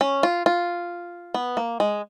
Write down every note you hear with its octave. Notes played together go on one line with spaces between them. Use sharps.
C#4
F4
F4
B3
A#3
G#3